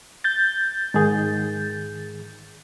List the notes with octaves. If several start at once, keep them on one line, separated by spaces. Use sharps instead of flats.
G6 A6
G#2 D#3 G#4